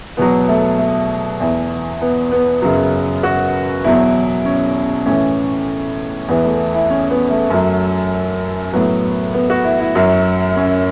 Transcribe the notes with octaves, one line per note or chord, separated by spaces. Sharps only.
E2 B2 F#3 B3
A3
A3
E2 E3
B3
B3
F#2 C#3 F#3
F#4
E2 B2 F#3 E4
C#4
A2 E3 C#4
E2 E3 B3
A3
E4
C#4
B3
A3
F#2 F#3
A2 F#3 B3
B3
F#4
E4
E4
F#2 F#3
C#4